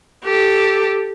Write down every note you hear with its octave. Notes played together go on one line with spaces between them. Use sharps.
G4 A4